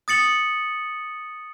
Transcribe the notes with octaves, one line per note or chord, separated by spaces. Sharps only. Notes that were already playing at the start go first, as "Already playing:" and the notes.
D#6 A6 C#7 F#7